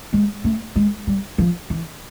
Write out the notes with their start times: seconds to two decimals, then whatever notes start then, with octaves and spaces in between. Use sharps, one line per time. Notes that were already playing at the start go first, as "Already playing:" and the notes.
0.13 G#3
0.44 A3
0.76 G#3
1.07 G3
1.38 F3
1.70 E3